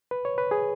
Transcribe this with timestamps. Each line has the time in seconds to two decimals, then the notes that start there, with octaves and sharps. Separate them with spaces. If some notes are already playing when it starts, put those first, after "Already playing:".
0.11 B4
0.25 C#5
0.38 B4
0.51 G#4